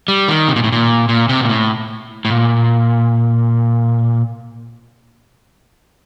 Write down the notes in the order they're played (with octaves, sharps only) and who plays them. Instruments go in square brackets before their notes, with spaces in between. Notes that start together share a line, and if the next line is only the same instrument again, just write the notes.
[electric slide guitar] G3
D#3
C3
A#2
A2
A#2
A#2
C3
A#2
A2
A2
A#2